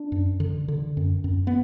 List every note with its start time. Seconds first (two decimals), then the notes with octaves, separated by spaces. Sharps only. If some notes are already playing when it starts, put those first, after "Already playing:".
Already playing: D4
0.12 F#2
0.40 D3
0.68 D3
0.97 F#2
1.24 F#2
1.47 B3